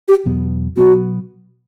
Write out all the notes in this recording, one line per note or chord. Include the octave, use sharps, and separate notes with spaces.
G4
E2 B2 F#3 B3
B2 F#3 B3 F#4